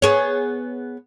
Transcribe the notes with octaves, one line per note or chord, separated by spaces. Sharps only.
B3 G#4 C#5